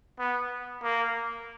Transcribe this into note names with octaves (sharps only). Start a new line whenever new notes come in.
B3
A#3